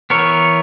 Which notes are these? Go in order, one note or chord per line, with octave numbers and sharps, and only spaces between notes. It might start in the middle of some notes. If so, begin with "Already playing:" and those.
E3 B3 A#4 C#5